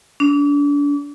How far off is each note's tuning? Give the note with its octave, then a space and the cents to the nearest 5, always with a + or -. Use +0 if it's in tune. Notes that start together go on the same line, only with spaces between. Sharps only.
D4 -35